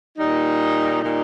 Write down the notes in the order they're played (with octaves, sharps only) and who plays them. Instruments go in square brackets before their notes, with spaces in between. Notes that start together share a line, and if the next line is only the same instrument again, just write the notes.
[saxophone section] A#2 G3 D#4
A#2 G3 D#4